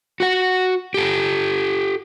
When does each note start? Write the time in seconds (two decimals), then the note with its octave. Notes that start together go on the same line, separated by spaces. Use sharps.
0.20 F#4 F#5
0.94 G4 A4